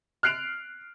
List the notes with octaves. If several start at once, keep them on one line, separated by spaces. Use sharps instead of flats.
F6 F#6 C7 D7 F7